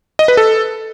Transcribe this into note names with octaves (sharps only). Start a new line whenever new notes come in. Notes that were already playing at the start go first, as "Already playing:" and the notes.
D#5
B4
A4